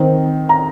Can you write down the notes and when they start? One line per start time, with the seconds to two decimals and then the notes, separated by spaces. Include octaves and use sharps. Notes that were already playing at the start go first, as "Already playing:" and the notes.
Already playing: D#3 C4
0.49 A#5